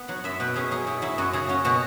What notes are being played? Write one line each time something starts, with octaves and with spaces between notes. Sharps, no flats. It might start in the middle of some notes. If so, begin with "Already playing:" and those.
Already playing: B3
F#3 F#5
F#2 E5
B2 B4
C#4 G#4
F#3 G#4
B2 E4
F#3 E4
F#2 F#4
C#3 G#4
C#4 F#4
B2 F#4